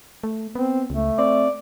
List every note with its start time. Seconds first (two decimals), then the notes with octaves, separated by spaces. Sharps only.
0.24 A3
0.55 B3 C4
0.90 C#2 A3
1.19 C4 D5